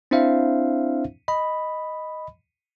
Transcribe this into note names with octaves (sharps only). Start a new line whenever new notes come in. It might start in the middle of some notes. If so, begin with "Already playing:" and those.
C4 D4 E4 C5 E5 F5
D#5 B5